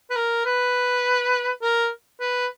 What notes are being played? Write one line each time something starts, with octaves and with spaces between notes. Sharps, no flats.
B4
A#4
B4
A#4
B4